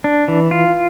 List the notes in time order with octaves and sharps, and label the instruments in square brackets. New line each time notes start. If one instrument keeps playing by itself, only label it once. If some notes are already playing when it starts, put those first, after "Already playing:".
[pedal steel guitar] D4
E3
F4